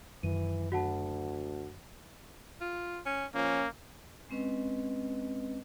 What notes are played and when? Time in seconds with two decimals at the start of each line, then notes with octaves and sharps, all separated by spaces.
0.23 F#2 D#3 E3 D#7
0.72 D2 F#4 F#5 A5
2.61 F4
3.06 C#4
3.35 F3 A#3 C#4
4.30 G#3 C4 C#4 B4 D#5